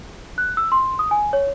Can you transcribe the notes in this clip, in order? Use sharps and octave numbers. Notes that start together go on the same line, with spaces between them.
F#6
E6
C6
D#6
G#5
C#5